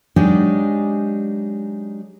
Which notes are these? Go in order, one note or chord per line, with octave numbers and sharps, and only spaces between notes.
F#3 G#3 D4 D#4 G4 G#4